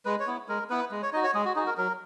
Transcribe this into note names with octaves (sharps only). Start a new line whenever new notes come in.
G#3 B4
C#5
B3 E4
G#3 A#4
B3 E4 B4
G#3
C#5
D#4 F#4 D#5
C#5
G#3 G#4
F#4
D#4 F#4 G#4
A#4
F#3 A#4